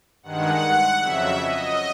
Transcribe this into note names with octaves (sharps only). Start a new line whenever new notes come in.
G2 D#3 G#3 F#5
F2 C#3 F#3 E5
D#5